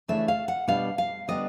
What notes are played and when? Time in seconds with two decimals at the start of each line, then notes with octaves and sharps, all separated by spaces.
0.08 C#3 E3 A3 D4 E5
0.28 F5
0.48 F#5
0.68 B2 G3 B3 D4 F5
0.98 F5
1.28 D3 G3 B3 D4 D#5